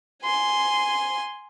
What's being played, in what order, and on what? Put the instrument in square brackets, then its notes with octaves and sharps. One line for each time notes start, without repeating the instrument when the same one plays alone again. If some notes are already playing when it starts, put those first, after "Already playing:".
[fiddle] G#5 C6